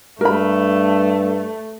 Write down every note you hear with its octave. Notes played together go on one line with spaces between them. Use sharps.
G2 A3 A#4 B5